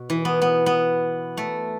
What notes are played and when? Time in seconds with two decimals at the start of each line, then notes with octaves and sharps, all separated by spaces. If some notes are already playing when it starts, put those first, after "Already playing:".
Already playing: B2
0.10 E3
0.25 B3
0.42 B3
0.66 B3
1.37 A3